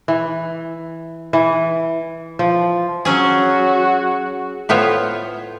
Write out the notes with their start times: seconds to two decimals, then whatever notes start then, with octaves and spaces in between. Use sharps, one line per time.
0.08 E3
1.33 E3
2.39 F3
3.05 F#3 C#4 F#4 G#4
4.69 A2 B3 F4 C5 C#5